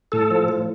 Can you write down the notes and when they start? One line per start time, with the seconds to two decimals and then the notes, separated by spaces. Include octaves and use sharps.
0.12 A2 A4
0.30 F3
0.48 A2